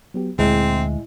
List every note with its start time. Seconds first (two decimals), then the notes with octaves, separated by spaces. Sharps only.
0.14 F#3 B3 G4
0.39 D2 A#2 G#3 C4 E4 E5